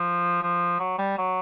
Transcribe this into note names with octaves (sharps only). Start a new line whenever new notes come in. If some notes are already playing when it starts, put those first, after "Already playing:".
Already playing: F3
F3
F#3
G3
F#3